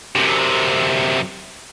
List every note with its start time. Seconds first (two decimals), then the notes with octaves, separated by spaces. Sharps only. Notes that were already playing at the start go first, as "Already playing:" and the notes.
0.15 F#2 C3